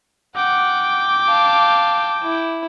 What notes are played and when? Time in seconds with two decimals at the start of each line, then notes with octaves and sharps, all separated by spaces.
0.36 F#5 G5 D6
1.28 F5 A5
2.23 E4